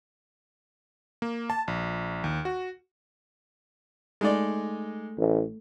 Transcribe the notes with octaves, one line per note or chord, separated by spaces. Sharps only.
A#3
A5
A#1
D#2
F#4
G#3 A3 D#4 D5
A1